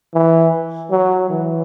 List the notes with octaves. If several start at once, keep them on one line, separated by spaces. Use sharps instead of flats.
E3
F#3
E3